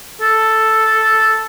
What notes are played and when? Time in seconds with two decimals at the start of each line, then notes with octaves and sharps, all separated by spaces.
0.21 A4